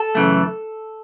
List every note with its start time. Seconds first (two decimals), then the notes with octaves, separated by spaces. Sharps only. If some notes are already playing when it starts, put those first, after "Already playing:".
Already playing: A4
0.15 F#2 C#3 E3 A3